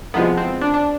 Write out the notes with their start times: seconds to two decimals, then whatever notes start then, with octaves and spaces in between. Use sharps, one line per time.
0.14 C2 C3 F3 G#3 B3
0.37 C4
0.61 D4
0.74 D4